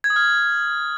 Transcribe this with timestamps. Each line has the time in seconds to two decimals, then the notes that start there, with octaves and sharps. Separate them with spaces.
0.04 G#6
0.10 D#6
0.16 F6